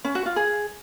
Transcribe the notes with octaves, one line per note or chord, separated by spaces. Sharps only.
C#4
F#4
F4
G#4